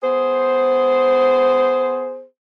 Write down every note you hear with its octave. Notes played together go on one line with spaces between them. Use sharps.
B3 G#4 C5